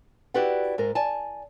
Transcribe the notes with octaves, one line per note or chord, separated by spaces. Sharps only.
E4 F#4 G4 B4 D5 F#5
G#2 G#3 A#4
D5 G#5 A5